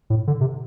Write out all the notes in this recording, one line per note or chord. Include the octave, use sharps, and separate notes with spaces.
A2
D3
C3